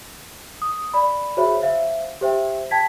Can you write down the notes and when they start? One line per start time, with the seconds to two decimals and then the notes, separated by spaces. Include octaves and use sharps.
0.62 D#6
0.94 D5 B5
1.37 F#4 G#4 C5 C#5 E5 B5
1.62 C5 E5 F5
2.21 G4 C5 E5 G5
2.71 G5 A5 G#6 B6